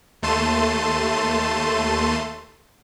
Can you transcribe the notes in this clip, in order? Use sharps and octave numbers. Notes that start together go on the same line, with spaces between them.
D#2 A3 A5 C6 D#7